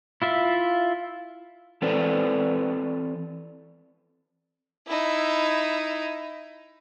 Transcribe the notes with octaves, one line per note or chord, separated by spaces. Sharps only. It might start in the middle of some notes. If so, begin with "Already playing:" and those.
E4 F4 E5
E3 C4 A4 B4 D5
D#4 E4